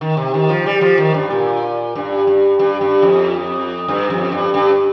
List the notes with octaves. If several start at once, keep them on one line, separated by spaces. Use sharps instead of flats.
D#3
C3
D#3
F3
G3
F3
D#3
G2
A#2
G2
G2
G2
G2
F2
G2
F2
G2
G2